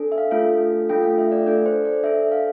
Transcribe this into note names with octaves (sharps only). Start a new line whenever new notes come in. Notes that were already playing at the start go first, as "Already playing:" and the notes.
Already playing: D4 A4
E5
F5
A3 D4 F4 A4 F5
A3 D4 F4 A4 G5
F5
E5
D5
D4 A4 D5
C5
D5
D4 A4 E5
F5